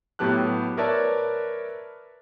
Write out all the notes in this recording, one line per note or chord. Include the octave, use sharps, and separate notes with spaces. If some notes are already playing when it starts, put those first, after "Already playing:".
A2 F#3 B3 G4 A5 F#6
A#4 B4 C#5 D5 E5 A5